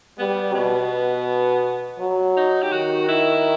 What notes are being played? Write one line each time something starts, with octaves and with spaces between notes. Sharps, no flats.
G3 B3
B2 B3
F#3
D#4
G4
D#3 F#4
E4